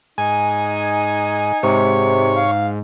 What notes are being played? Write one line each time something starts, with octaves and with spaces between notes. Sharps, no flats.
G#2 D#4 G#5
G#2 C3 C#5 C#6
F5